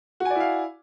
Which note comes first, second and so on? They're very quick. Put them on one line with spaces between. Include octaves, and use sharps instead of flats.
F#4 G#5 D5 E4 F5